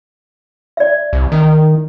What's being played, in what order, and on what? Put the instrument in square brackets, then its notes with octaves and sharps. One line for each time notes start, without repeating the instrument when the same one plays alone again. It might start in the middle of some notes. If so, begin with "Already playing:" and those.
[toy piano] D5 E5
[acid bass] C2
D#3